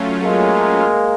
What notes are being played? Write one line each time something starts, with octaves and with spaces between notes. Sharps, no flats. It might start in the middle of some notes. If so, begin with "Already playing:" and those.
Already playing: F#3 A3 C#4 F4
G#3 A#3